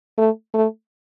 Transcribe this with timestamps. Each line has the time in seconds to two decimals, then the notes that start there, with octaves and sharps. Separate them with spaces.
0.18 A3
0.54 A3